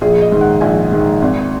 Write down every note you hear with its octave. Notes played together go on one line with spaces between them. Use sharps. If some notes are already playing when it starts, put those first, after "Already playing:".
A#1 G#4
D#5
G#2 D#3
F#5
A#1 G#5
G#2 D#3
G#1